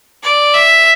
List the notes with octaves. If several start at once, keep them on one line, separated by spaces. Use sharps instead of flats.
D5
E5